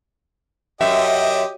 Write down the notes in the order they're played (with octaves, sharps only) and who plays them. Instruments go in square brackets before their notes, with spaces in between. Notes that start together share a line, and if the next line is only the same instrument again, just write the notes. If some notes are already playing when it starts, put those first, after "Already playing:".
[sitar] F#2 [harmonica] G4 D#5 G5 [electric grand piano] E5